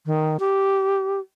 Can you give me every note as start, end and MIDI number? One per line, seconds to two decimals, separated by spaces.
0.06 0.37 51
0.40 1.20 67